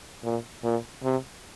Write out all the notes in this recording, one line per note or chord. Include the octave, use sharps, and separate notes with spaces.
A#2
A#2
C3